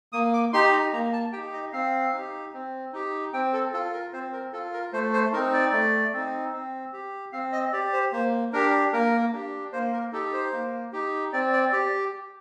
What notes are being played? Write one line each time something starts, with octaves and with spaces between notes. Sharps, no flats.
A#3 D#6
D6
D#4 G4 C6
A#5
A#3 A#5
A5
D#4 G4 G5
D#5
C4 F5
D#4 G4
C4
D#4 G4
C4 G5
A4
F4 A4
A#4
C4 C5
A#4
F4 A4
A#4
A3 C5
C5
C4 D#4 A#4
D5
A3
C4 D#4
C4
G4
C4 F5
D#5
G4 D5
C5
A#3 C5
D4 G4 A#4
A#3 A#4
D4 G4
A#3 C5
A#4
D#4 G4 A4
C5
A#3
D#4 G4
C4 D5
D5
G4 D5